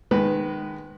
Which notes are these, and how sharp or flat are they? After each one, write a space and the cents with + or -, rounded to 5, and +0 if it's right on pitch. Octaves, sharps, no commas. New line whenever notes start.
D#3 -25 G#3 -15 B4 +0